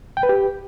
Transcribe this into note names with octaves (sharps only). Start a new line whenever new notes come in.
G5
B4
G4